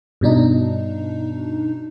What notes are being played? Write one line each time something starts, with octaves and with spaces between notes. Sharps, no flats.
G2 B2 D4 D#4